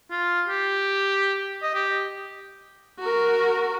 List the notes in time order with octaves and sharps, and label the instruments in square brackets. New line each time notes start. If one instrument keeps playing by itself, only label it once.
[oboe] F4
G4
D#5
G4
[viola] F#4 A#4